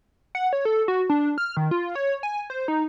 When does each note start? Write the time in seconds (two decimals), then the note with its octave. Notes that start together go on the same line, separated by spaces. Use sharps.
0.35 F#5
0.53 C#5
0.65 A4
0.88 F#4
1.10 D4
1.38 F6
1.57 D#3
1.71 F4
1.95 C#5
2.23 G#5
2.50 C5
2.68 D#4